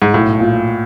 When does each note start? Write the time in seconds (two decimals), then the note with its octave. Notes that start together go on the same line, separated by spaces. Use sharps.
0.02 G#2
0.14 B1 A2
0.40 A#2